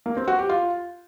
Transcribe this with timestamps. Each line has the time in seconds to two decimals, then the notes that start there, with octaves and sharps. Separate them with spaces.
0.06 A#3
0.17 C4
0.28 F#4
0.38 G4
0.49 F4